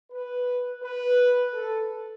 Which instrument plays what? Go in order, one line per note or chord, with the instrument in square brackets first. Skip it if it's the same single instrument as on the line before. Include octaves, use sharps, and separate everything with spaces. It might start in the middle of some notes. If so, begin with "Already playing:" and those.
[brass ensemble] B4
B4
A4